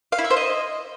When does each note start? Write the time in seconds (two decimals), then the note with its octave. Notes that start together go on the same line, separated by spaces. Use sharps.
0.12 F5
0.18 E4
0.24 E5
0.31 C5
0.37 D#5